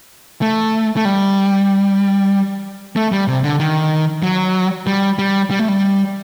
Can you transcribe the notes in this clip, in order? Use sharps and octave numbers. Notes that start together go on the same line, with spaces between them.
A3
A3
G3
A3
G3
C3
D3
D#3
F#3
G3
G3
G3
A3
G3